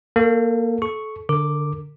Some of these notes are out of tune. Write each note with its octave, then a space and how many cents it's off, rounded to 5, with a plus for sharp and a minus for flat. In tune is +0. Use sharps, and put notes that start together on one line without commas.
A#3 +0 A4 +25
A4 -25 C#6 +0
D3 +0 A#4 -30 D6 +0